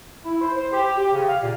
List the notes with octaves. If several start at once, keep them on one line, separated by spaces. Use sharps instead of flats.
E4
C5
C5
G4
G4
C#3
F5
A#2